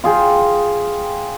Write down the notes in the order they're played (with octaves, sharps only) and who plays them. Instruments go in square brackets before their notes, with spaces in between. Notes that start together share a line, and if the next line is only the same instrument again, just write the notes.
[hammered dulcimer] F4 G#4 G5